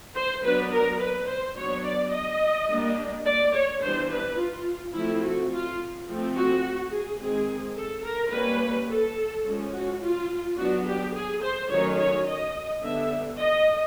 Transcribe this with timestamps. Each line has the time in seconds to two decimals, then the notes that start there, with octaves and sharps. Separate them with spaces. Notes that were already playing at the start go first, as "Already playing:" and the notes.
0.15 C5
0.44 F#3 B3 D4 B4
0.72 A#4
1.00 B4
1.28 C5
1.57 F#3 B3 D4 C#5
1.84 D5
2.12 D#5
2.69 G3 A#3 D4
3.25 D5
3.54 C#5
3.81 E3 G3 B3 D4 C5
4.10 B4
4.37 F4
4.94 F3 A3 C4 E4
5.22 F#4
5.51 F4
6.07 F3 A3 C4
6.35 F#4
6.91 G#4
7.20 D#3 G#3 C4 G#4
7.77 A4
8.04 A#4
8.33 G3 A#3 C#4 B4
8.89 A4
9.45 F3 G#3 C#4
9.73 F#4
10.01 F4
10.57 F#3 B3 D4 F#4
10.86 G4
11.14 G#4
11.43 C5
11.70 D#3 F#3 A3 C#4 C#5
11.99 C#5
12.27 D#5
12.83 D3 G3 B3 D4 E5
13.40 D#5